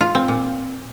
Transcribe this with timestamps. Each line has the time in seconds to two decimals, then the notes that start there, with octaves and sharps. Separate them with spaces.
0.01 F4
0.15 C4
0.28 A#2